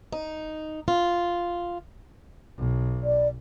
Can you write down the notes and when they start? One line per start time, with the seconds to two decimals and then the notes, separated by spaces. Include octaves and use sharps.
0.12 D#4
0.88 F4
2.58 B1
3.03 D5